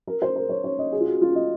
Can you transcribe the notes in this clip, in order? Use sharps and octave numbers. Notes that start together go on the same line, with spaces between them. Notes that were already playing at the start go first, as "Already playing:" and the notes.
A#4
C5
A#4
C#5
C#5
D#5
G#4
F4
F#4
F4
D#5